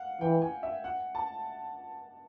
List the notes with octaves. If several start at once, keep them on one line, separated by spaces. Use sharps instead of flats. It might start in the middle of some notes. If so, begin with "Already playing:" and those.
Already playing: F5 F#5
E3 G5
G#5
E5
F#5
A5